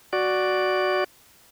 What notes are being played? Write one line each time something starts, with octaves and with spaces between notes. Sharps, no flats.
F#4 D5